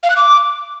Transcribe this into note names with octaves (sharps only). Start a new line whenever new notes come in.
F5
F#6
D6